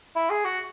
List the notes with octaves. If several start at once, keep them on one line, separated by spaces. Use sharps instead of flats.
E4
G#4
F#4